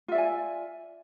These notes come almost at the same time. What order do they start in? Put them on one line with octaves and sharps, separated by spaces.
F4 E5 D5 G#5